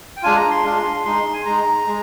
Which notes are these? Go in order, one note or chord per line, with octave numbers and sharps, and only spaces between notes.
G5
G#3 D4 F4 G#5
A#5
C6
G#3 D4 F4
G#3 D#4 C6
G#5
G#3 D#4 A#5
G#3